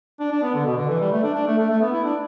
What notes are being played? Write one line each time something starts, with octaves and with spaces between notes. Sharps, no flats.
D4
D4
B3
D3
B2
D3
E3
G3
A3
D4
D4
A3
A3
A3
B3
E4
D4